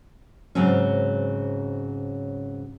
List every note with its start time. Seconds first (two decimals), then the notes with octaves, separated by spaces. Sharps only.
0.55 G#2 C#3 F#3 C4 C#4